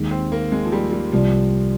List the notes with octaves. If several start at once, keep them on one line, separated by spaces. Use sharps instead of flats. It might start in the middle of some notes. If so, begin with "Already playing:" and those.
Already playing: D#2 D#3 G#3
C4
A#3
G#3
F3
G3
G3
C2 C3 F3 G3